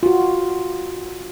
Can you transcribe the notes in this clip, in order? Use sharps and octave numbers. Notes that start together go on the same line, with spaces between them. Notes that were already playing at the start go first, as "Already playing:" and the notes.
F4 F#4